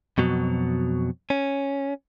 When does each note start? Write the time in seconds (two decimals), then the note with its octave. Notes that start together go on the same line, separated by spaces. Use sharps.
0.18 F2 B2 F#3
1.30 C#4